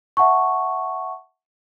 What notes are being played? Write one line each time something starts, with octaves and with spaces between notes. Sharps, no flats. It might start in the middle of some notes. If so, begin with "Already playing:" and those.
E5 F#5 A5 C#6